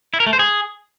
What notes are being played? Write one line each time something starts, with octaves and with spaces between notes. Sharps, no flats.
E4
A#4
A3
C5
G#4